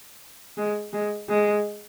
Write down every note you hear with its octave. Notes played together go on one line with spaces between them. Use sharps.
G#3
G#3
G#3